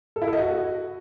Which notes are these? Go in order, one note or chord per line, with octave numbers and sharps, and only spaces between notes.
A4
E4
A4
D#5
F#4